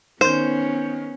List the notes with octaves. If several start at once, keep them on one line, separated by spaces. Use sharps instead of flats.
D#3 B3 C#4 C5 G6